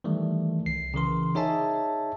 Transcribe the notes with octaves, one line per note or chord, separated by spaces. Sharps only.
D#3 E3 G3 A3
C2 C7
C#3 E3 A#4 C6
D#4 G#4 C#5 E5 G#5 A5